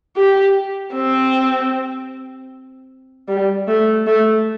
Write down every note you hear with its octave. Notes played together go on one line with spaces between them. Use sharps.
G4
C4
G3
A3
A3